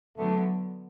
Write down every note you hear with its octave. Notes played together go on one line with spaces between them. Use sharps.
D3 F#3 A3 B3